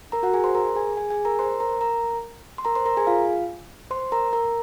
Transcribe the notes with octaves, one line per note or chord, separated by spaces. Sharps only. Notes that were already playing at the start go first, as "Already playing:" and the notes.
A#4 A#5
F#4 F#5
G#4 G#5
C5 C6
A#4 A#5
G#4 G#5
G#4 G#5
G#4 G#5
A#4 A#5
C5 C6
A#4 A#5
A#4 A#5
C6
A#4 A#5
C5 C6
A#4 A#5
G#4 G#5
F4 F5
C5 C6
A#4 A#5
A#4 A#5